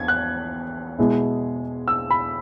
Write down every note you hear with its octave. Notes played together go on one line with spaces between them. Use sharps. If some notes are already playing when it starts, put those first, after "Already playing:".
Already playing: E2 G#6
F#6
B2 G#3 E4
E6
B5